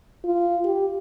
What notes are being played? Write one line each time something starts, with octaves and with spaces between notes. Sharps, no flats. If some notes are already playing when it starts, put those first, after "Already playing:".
F4
G4